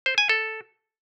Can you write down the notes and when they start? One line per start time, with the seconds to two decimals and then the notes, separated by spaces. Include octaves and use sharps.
0.06 C5
0.18 G#5
0.29 A4